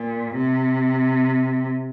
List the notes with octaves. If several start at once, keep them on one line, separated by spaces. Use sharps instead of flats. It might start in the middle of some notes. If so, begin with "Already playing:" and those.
Already playing: A#2
C3